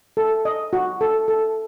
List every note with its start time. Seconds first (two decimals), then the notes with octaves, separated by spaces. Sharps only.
0.17 A4
0.45 D#5
0.73 F#4
1.01 A4
1.28 A4